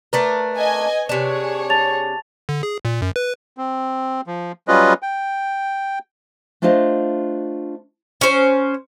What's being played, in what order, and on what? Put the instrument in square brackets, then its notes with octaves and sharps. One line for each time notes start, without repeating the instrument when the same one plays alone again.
[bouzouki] A3 D4 A#4 [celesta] B4
[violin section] D#5 G#5
[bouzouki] C3 D4 [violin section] G#4 C#5
[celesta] A5 A6 F7
[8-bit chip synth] D3
G#4
A#2
F#2
B4
[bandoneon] C4
F3
F#3 G3 C#4 F4 B4 D#5
G5
[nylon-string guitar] A3 D4 F4 C5 D#5 F5
[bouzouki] C#4 C5